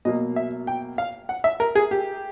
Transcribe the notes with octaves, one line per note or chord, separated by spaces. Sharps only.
B2 F#3 A#3 D#5
E5
G5
F5
F#5
E5
A#4
G#4
G4